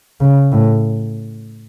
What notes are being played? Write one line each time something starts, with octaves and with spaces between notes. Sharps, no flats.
C#3
A2